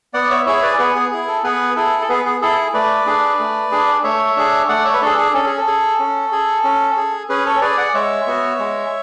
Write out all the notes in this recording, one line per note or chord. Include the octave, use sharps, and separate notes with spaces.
B3 D5 F#5
C#5 E5
E4 G#4 C#5 E5
B4 D5
B3 G#4 B4
G#4
E4 G#4
A4
B3 G#4 B4
E4 G#4 A4
A4
B3 G#4 B4
G#4
E4 G#4 A4
A3 B4 D5
D4 G#4
A3
D4 G#4
A3 C#5 E5
D4 G#4
A3 D5 F#5
C#5 E5
B4
D4 G#4 A4
G#4
C#4 A4
G#4
A4
G#4
C#4
G#4
C#4
G#4
C#4 G#4 B4
A4 C#5
G#4 B4 D5
D5 F#5
G#3 C#5 E5
B3 F#4
G#3